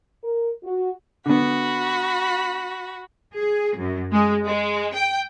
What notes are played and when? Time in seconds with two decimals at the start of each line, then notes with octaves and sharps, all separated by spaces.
0.24 A#4
0.64 F#4
1.26 D3 B3 F#4 B5
3.35 G#4
3.76 F#2
4.12 G#3
4.44 G#3
4.94 G5